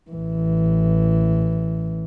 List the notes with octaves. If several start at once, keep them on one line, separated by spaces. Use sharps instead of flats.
A1 E3